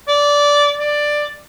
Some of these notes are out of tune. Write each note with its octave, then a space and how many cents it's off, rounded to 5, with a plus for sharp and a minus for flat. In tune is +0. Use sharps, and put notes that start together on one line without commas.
D5 -15
D5 +10